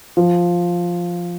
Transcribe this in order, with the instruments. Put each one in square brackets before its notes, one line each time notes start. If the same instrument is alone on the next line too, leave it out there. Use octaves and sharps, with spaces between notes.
[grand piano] F3